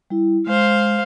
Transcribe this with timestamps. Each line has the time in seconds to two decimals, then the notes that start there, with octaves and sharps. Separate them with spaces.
0.10 G3 E4
0.47 G#3 C5 F5